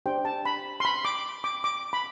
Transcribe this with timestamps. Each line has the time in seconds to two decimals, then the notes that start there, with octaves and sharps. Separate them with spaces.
0.06 D4 G4 C5 G5
0.25 A5
0.45 B5
0.80 C6
0.85 B5
1.05 D6
1.44 D6
1.64 D6
1.93 B5